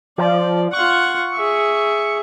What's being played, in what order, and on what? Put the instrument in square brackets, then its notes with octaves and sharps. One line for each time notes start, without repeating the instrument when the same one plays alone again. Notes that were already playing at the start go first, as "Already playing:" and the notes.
[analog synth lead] F3 [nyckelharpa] D5
[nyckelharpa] F4 F#5 [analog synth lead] C#6
[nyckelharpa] G#4 E5